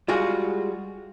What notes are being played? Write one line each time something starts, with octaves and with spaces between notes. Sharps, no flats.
G3 G#3 F4 F#4 G#4